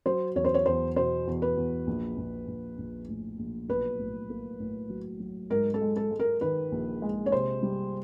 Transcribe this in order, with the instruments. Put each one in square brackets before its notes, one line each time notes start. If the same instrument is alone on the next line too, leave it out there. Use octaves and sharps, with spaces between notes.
[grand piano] F#3 [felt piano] C5
[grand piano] E2 [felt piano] C#5
[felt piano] C5
C#5
[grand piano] E2 [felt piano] C5
[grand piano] B2 [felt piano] C5
[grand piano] E2
[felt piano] B4
[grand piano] E2
A#1
A#1
A#1
A#1
A2
A#1
[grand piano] B1 [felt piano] B4
[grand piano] A2
A#3
A2
F#3
F#3
[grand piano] G#2 [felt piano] A#4
[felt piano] A4
[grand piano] G#3
[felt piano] A4
[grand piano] G#3
[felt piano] A#4
[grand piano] D#3 [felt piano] B4
[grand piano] A#1
G#3
[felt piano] C#5
[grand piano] C3 [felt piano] C5
[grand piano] G3